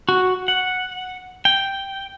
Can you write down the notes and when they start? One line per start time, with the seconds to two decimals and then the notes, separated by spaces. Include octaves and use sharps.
0.09 F#4
0.48 F#5
1.45 G5